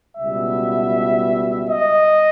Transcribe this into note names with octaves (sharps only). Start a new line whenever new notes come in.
C#2 B2 G3 E5
D#5